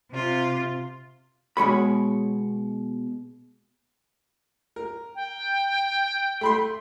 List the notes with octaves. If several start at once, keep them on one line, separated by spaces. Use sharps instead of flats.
C3 F4
B2 G#3 C#5 B5
A#4
G5
A3 B5 C6